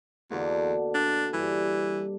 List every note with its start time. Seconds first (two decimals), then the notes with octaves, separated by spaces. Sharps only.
0.31 E2 B2 D3 A#3
0.95 D4
1.33 G2 E3